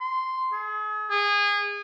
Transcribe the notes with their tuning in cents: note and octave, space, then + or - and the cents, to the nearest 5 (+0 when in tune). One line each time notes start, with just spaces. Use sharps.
C6 -10
G#4 +40
G#4 -25